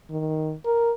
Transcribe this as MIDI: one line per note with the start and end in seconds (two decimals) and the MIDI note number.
0.10 0.54 51
0.66 0.92 70